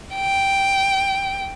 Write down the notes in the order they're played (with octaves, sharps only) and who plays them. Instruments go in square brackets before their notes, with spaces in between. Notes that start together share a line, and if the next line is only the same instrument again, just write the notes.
[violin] G5